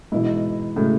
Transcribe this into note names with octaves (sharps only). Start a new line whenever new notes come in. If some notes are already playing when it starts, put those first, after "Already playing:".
G#2 B2 E3 B3 E4
A2 C#3 G#3 C#4 F#4